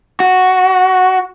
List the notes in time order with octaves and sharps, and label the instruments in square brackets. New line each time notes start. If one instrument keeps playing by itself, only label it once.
[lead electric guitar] F#4